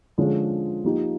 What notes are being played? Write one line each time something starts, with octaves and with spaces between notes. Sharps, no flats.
D3 F3 G#3 C#4
F3 A#3 D#4 G4